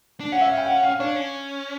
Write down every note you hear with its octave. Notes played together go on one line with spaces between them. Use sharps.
D4
C#4 F#5
E5
F5
G5
F#5
F5
D4 C#5
C#4